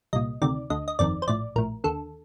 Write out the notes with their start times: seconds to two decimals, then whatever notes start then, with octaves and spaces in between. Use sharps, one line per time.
0.13 C2 A#2 D#5
0.42 D2 C3 D#3 D5
0.70 D2 D3 D#5
0.88 D#5
0.99 G1 F2 D#3 D5
1.22 C5
1.28 A#1 A2 D5
1.56 A#1 A2 A#4
1.84 D#2 D3 A4